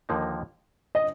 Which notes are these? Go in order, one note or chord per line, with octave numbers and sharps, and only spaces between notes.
D#2 D3 F3 A#3 D#4
D#5